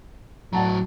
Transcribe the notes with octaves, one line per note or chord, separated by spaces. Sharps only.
A2 F#3 F#5 A5 A#5